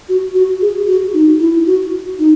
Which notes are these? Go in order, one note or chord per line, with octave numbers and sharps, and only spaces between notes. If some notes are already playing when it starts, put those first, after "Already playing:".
F#4
F#4
G#4
F#4
D#4
E4
F#4
D#4